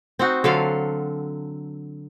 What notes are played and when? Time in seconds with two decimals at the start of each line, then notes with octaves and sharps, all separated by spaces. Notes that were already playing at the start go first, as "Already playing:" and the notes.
0.19 C4 D#4 F#4
0.44 D3 F#3 A4 F5